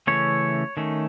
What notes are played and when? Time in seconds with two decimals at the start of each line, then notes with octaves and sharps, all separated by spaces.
0.07 C#3 E3 A3 C#4 C#5
0.77 D#3 A3 C#4